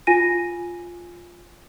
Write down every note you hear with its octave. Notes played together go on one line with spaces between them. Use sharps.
F4 G#5 A#6 D#7